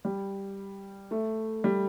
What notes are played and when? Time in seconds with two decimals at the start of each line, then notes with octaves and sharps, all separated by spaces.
0.05 G3
1.11 A3
1.64 G3